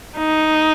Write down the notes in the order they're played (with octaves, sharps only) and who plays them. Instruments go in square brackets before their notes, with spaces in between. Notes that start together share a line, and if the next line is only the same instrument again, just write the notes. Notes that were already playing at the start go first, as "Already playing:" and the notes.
[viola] D#4